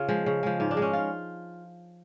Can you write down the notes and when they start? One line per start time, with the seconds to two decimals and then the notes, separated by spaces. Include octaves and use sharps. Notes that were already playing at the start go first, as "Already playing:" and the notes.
Already playing: C#3 F4
0.09 F3 G#3
0.26 C#3
0.43 F3 G#3
0.60 G#2 F4
0.71 D4
0.77 G#3
0.82 C#4
0.93 F4